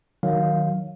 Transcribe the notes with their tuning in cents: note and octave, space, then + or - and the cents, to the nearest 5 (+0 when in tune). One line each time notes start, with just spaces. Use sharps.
D#3 +0 F#3 +0 F5 +5